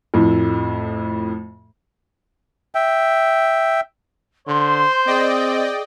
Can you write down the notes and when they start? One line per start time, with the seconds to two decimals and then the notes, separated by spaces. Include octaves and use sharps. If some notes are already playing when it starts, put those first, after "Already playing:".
0.14 F2 A2
2.75 E5 G5
4.48 D3 C5 C6
5.07 C4 G#4 D5 D#5 G5